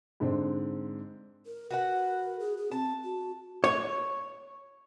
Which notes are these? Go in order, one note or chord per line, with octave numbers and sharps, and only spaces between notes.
G#2 D3 G#3 C4
A#4
F#4 A#4 B4 F#5
G#4
G#4
C4 A5
F#4
C#5